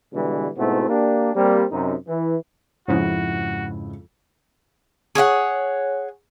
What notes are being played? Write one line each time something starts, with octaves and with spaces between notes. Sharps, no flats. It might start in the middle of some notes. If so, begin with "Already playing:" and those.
B2 D3 E3 G3 G#3
G#2 B2 A3 C4 E4 F#4
A#3 D4 G4
G3 A#3 C4
F#2 C3 D#4
E3
F2 G#2 C#3 E4 F#4
G#4 C#5 F5 F#5